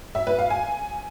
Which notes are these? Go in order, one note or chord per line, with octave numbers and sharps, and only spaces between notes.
E5
B4
F5
G#5